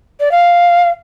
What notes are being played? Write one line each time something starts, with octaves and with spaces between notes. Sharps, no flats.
D5
F5